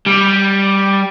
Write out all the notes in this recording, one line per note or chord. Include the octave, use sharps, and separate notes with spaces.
G3